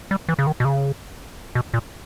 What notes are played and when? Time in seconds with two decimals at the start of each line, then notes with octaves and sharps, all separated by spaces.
0.11 G3
0.29 E3
0.39 C#3
0.47 D#3
0.60 B2
0.65 C#3
1.55 B2
1.74 A#2